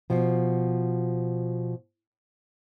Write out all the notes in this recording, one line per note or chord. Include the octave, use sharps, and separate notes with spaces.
B2 F3